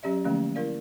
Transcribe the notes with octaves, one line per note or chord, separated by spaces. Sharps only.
F#3 C#4 G4 D5 E5
D3 F3 A3 A#3 C#4
E4 A#4 D5 F5